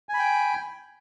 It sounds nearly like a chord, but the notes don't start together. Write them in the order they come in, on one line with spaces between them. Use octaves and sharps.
G#5 B5 G5